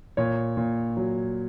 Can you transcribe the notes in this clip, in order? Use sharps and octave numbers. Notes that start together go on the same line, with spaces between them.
A#2 C#5
A#2
F#3